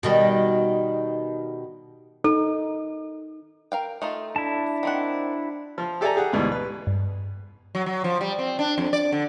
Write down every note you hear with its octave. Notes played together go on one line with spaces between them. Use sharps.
B2 D#3 G3
D#4 A4
A#4 F5 G5
A3 D#4 F4
D4 E4 A5
D#3 C4 F#5
F3 F4
G4 A4 D5 E5 G#5 A#5
G4 G#4 F#5
D2 G#2 B2 E3 G3
B4
G2
F#3
F#3
F3
G3
C4
D4
F2
D5
D3